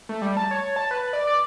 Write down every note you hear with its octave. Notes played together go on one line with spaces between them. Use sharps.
A3
G3
A5
C#5
A5
B4
D5
D5